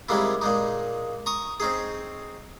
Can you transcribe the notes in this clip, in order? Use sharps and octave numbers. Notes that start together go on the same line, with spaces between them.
C3 D#3 G3 G#3 A#3 E4
A#2 G#3 D#4
A#5 C#6 D#6
C4 C#4 D#4 G#4